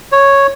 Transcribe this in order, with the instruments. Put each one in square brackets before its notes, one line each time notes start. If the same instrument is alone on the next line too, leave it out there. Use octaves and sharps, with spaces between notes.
[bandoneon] C#5